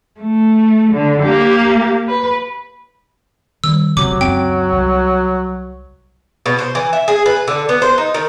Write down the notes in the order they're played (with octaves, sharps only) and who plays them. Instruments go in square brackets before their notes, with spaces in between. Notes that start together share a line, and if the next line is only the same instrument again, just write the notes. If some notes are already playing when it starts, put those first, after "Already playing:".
[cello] A3
D3
A#3 G4
B4
[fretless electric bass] D#3 F3 G3 [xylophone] E6
[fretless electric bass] E1 A1 C3 [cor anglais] F#3 [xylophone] D6
[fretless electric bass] C#2 F#2 C4 [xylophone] G5
[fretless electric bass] C2
[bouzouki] B2
C5
E3
E5
G#4
B4
D3
B3
C5
D#4
D#3